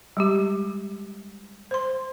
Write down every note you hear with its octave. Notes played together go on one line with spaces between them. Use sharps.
G3 G#3 G4
C5 C6